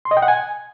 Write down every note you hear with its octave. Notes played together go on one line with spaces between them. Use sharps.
C6
D#5
G5
F#5
G#5